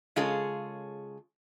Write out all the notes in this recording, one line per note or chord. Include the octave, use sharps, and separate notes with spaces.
C#3 G#3 F4 G#4 A4 C#5